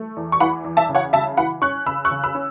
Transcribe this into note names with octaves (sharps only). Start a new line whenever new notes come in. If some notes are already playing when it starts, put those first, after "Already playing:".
Already playing: A3
E2
C#6
E3 F#5 B5
E2
E5 A5
C#3
C#5 F#5
C#3 E5 A5
E3 F#5 B5
C#4 C#6 F#6
C#3 B5 E6
C#6 F#6
C#3
B5 E6
C#4